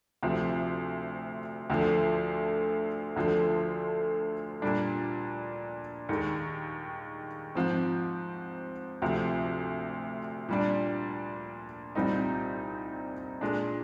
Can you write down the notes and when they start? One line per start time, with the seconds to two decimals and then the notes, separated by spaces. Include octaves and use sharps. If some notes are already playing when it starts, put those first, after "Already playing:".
0.23 D2 C3 F3
1.70 D2 D3 F3
3.16 D2 D3 F3
4.62 A#2 G3 D4
6.09 D#2 D#3 G#3
7.55 G#2 F3 C4
9.02 D2 C3 F3
10.49 A#2 G3 D4
11.95 C2 A#2 G3 C4 D#4
13.41 A#2 G#3 D4